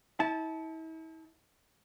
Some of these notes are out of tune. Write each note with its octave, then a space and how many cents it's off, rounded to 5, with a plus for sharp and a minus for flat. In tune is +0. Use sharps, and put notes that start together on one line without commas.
E4 -40 A5 -15